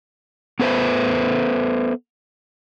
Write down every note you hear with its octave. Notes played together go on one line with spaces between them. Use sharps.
B3 A4 B4 C5 E5